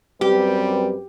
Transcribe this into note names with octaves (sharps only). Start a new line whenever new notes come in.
F#2 G3 C4 G4 B4